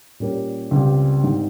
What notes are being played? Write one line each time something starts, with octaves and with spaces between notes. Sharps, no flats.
A#2 G3 C#4 G4 A#4
C#2 C#3 G3 C4 G4
G#1 G#2 G3